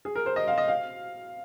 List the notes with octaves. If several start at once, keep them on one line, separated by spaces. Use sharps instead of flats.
G#4
A#4
C5
D#5
F5
D#5
F5